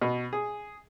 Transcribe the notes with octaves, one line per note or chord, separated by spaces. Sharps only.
B2
G#4